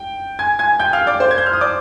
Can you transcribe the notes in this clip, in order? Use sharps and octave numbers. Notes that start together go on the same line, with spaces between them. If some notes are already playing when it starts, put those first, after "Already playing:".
Already playing: G5
G#5 G#6
G#5 G#6
G5 G6
F5 F6
D5 D6
C5 C6
G#6
G6
F6
D#6
D5 D6